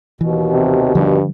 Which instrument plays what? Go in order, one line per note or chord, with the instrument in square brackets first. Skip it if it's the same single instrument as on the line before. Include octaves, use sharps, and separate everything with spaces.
[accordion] D#2 B2 [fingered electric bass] E3
[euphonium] C3
[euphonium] G2 [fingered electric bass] D3 F3 G3